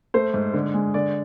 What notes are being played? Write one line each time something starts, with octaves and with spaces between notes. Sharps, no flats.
A3 C5
G#2
D3
G#3
D3 D5